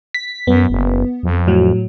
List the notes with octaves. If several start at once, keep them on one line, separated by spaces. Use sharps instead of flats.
B6
F#2 B3
F#1
F2
A2 F#3